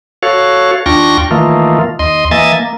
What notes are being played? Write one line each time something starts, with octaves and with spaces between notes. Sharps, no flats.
F#4 A4 C#5 F5
D#2 D4 F4 G5 C#6 A#6
D#3 E3 A3 A#3 F4
D#2 D#5 C6
E3 A#3 D#5 E5 G#5 A6
A#3